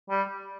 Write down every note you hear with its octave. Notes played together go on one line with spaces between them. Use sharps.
G3